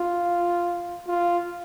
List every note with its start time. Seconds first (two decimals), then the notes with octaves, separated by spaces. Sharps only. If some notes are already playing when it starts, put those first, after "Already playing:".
Already playing: F4
1.08 F4